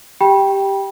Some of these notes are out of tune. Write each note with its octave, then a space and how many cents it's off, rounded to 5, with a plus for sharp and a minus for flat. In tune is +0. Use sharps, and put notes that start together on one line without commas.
G4 +0 G5 +0 B5 -30